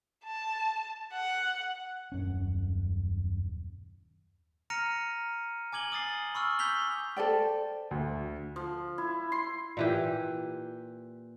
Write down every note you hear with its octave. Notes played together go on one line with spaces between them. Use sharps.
A5
F#5
D#1 F#2 C#4
A#5 F6 A#6 C#7 D#7
G#5 D6 G#6 F#7 G7
D6 D#6 A6 C7
B5 C#6 E6 F6
G6 B6 F7 G7
A4 C5 D5 G5
D2
F3
E4
C6
A#2 E3 G4